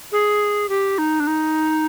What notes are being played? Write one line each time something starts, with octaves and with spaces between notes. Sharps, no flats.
G#4
G4
D#4
D4
D#4